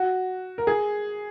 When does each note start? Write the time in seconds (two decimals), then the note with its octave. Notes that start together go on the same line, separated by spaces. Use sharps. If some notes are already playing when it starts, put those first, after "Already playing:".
Already playing: F#4
0.58 A#4
0.67 G#4